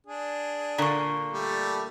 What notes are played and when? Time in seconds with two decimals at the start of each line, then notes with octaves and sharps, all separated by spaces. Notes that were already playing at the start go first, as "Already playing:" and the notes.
0.06 D4 G#4
0.78 A#2 D3 A#3 A#5 C#6
1.31 G3 A3